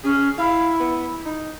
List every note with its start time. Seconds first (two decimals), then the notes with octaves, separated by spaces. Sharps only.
0.04 C#4 G#4
0.38 E4 F5
0.80 B3
1.26 D#4